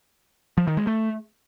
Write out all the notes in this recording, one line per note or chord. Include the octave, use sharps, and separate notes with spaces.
F3
D#3
G#3
A3